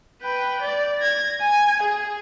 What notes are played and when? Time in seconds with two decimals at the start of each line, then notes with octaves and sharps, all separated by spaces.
0.22 B4 G5
0.62 D5
1.00 G#6 A#6
1.41 G#5
1.83 G#4